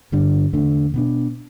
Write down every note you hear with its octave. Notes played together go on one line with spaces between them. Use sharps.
G2 D3 G3 D4
E2 D3 A3 D4
B2 B3 D4